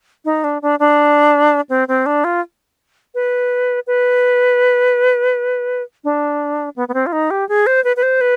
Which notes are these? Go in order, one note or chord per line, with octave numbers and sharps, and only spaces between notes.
D#4
D4
D4
D4
C4
C4
D4
F4
B4
B4
D4
B3
B3
C4
F4
D#4
G4
G#4
C5
B4
B4
C5
B4